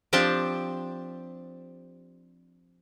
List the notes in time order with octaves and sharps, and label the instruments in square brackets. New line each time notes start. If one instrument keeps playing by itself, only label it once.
[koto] F3 C4 D4 G4 A5